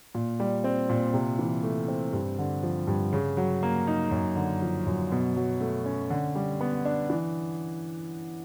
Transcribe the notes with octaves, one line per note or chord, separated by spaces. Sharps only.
A#2
G3
C4
A#2
C3
E3
A3
C4
G2
D3
F3
G2
C#3
F#3
A#3
D#4
F#2
D3
F3
F#2
B2
F#3
A3
C#4
D3
G3
B3
D4
E3